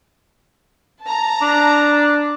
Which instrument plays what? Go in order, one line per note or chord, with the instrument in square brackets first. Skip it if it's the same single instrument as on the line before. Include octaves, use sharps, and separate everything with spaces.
[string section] A5 A#5
[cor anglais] D4